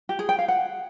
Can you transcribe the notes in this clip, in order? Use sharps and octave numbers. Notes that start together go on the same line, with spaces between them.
G4
G#4
G5
F5
F#5